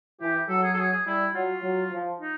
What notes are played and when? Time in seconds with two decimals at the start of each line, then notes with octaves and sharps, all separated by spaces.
0.21 E3 G4
0.49 F#3 A4
0.64 G#4
0.73 A4
0.78 G#4
0.92 G#4
1.06 G3 E4
1.34 F#3 F4
1.63 F#3
1.91 F3
2.20 D#4